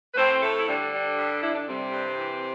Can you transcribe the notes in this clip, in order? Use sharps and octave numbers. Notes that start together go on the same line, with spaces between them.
B4
A2 C4 C5
A2 A3 A4
E4
D3 G3 D4
G3
G2
D3 E4
D4
C3 G3 C4
G2
E3